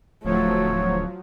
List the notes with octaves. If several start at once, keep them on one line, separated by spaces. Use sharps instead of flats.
D1 F3 F#3 A3 C#5